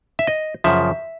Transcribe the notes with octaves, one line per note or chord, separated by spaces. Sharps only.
E5
D#5
F#2 C#3 F3 E5